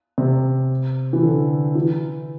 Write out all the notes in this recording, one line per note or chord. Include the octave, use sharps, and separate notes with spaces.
C3
E3
D3
E3